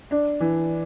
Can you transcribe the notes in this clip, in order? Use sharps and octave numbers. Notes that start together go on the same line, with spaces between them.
D4
E3